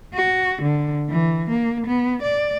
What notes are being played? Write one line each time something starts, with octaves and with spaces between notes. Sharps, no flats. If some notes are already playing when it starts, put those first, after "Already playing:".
F#4
D3
E3
A#3
B3
D5